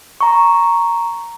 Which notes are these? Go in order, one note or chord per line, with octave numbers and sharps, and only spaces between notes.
A#5 C#6